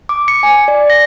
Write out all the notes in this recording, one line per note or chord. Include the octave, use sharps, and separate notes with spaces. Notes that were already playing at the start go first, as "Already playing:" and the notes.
D6
C#7
G#5
D5
A#6